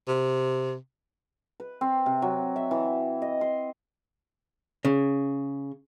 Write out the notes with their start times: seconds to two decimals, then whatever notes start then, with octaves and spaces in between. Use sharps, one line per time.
0.08 C3
1.60 B4
1.81 C4
2.06 C3
2.22 F#3
2.56 E5
2.71 E3
3.22 D#5
3.41 C6
4.85 C#3